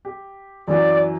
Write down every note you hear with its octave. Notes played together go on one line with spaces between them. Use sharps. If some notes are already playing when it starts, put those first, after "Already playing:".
G4
F#2 E3 F#3 D5